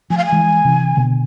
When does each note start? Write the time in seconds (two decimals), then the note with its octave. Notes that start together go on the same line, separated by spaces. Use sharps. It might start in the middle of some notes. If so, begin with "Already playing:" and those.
0.10 F3 A3 G#5
0.18 F5
0.26 G#5
0.32 E3 G#3
0.65 C3 E3
0.97 B2 D3